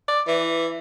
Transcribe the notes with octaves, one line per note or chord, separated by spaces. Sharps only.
D5
E3